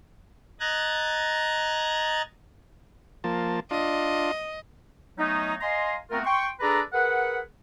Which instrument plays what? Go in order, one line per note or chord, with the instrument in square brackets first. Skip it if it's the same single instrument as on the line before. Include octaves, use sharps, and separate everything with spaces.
[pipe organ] D#5 A#5 F#6 G#6 A6
[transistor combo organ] F3 A#3 A5
[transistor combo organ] D4 F4 [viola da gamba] D#5
[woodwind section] F#3 A3 B3 C#4 D#4
D#5 F5 G#5 A#5 C6
A3 B3 C4 F4 F#4 A#4
G5 C6 C#6
D4 G#4 A4 B4 D5 A#5
G#4 A#4 B4 F#5